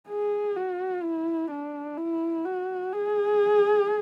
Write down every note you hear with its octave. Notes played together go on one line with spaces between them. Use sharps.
G#4
F#4
E4
D4
E4
F#4
G#4